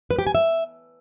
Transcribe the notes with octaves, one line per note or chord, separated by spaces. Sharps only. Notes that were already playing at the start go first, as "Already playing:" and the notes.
B4
G4
G#5
E5